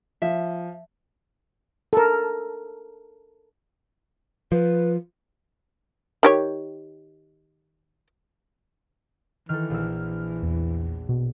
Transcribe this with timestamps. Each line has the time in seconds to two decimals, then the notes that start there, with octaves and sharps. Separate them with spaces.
0.22 F3 E5
1.93 A4 A#4
4.52 F3 B4
6.23 D#3 G4 C#5
9.49 D#3 E3 A4 F6
9.70 A#1 E6
10.43 E2
11.09 B2